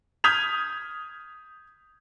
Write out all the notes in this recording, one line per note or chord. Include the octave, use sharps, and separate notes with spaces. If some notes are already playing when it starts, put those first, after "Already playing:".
D#6 F6 G6 G#6 B6 F7